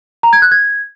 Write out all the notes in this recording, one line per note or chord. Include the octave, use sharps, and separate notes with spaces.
A#5
G#6
F#6
G#6